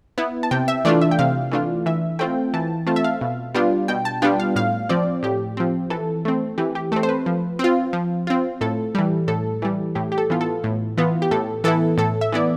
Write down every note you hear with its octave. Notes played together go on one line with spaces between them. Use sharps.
B3 E4
A5
C3 G5
E5
E3 A3 D4 F4 D5
E5
G5
C3 F5
E3 A3 D4 F4
E3 E5
A3 C4 F4 G5
E3 A5
A3 C4 F4 A5
E5
F5
B2
G3 B3 D4 F4
B2 G5
A5
G3 B3 D4 F4 G5
F5
A2 F5
F3 C4 D5
A2 G4
F3 C4
E3 A4
A3 C4
E3 G4
G4
A3 C4 A4
C5
B4
F3
C4 F4
F3
C4 F4
A2 A4
E3 G3
A2 A4
E3 G3
A2 G4
G4
A4
E3 B3 F4
A4
A2
E3 B3 F4
G4
A2 A4
E3 B3 E4 A4
A2 A4
E5
E3 B3 E4 D5